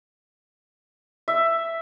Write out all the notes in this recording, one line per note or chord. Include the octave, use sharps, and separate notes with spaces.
E5